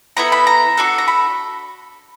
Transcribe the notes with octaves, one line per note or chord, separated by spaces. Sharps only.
B3 E4 A4 A#5
B5
A#5
D4 F#4 A4
A#5
B5